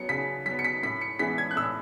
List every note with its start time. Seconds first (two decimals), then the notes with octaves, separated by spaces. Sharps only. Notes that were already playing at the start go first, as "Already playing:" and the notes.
Already playing: F#3 B3 C#7
0.09 C#3 B6
0.46 F#3 B3 B6
0.59 C#7
0.64 B6
0.83 A2 B6
1.01 C#7
1.19 E3 G#3 B3 B6
1.38 G#6
1.51 F#6
1.56 A2 E6